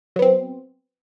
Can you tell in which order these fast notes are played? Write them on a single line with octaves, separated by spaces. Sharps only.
F#3 B3 C4